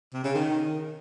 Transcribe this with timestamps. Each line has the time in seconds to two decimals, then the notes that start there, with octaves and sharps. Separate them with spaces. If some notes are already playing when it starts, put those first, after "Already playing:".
0.14 C3
0.24 C#3
0.35 D#3